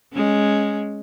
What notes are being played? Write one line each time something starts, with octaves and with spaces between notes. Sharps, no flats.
G#3 C#4